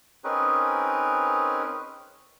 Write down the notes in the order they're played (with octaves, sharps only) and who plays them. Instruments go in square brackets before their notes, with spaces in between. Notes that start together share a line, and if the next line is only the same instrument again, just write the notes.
[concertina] C4 C#4 D#4 G#4 A#4 B4